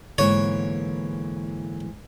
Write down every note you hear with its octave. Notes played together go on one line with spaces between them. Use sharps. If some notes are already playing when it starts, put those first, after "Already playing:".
G#2 D3 E3 A#3 B3 C#5